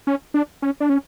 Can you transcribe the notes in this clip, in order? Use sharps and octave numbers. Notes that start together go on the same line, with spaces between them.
C#4
D4
C#4
D4
C#4